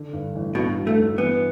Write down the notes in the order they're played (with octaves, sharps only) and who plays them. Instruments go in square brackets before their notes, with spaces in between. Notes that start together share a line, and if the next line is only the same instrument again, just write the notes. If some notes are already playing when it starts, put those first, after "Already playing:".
Already playing: [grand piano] D3
G2
A1
[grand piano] G2 [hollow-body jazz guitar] B2
[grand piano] F#3
[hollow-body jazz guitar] A3
[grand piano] G2
[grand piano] E3 [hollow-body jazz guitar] B3